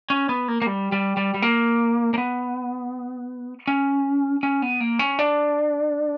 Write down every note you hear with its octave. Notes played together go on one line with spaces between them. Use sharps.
C#4
B3
A#3
A#3
G3
G3
G3
G3
A#3
A#3
B3
C#4
C#4
B3
A#3
C#4
D4